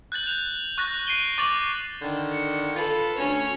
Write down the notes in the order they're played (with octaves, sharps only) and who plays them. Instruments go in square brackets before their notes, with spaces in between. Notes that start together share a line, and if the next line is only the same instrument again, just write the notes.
[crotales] F#6 G6 A6 F#7
F7
C#6 F#6 A6 A#6 F7
C7 D7 D#7 G7
C#6 D6 A6 F7 F#7
[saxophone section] D3 D#3
[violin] C#7
[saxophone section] F4 B4 [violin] A4
[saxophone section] D2 [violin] C#4 C#5